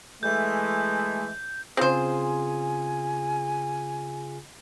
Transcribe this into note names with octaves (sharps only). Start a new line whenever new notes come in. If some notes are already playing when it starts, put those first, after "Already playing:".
E3 G#3 A3 G6
C#3 C4 F4 G#4 C5 G#5